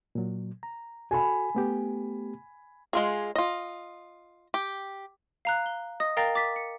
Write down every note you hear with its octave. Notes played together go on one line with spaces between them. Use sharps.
A#2 F#3
A#5
F#4 A4 G#5 B5
A3 B3 G4
G#3 F4 G#4
F4 D#5
G4
F5 A#5 F#6
G7
D#5 D#6 A#6
A#4 F5 G5 A#5 A6 A#6
D6 A6 B6
C#7